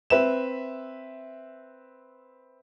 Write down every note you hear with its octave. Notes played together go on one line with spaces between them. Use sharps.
C4 B4 E5 E7